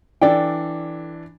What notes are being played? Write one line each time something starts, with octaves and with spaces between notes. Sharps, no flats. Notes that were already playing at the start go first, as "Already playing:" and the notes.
E3 D4 A4 D5 G5